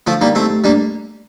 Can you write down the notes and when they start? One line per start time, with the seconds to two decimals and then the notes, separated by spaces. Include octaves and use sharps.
0.07 D3 F3 A3
0.21 G3 A#3 D#4
0.35 A3 C4 G4
0.50 A3
0.64 G3 A#3 D4